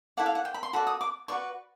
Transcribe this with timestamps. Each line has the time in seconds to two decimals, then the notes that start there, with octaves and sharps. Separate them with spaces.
0.17 E4 A4 D5 F#5
0.26 F5
0.35 F#5
0.45 G5
0.54 B5
0.63 C6
0.73 F#4 A4 D5 B5
0.87 D#6
1.01 D6
1.28 F#4 B4 D5 C#6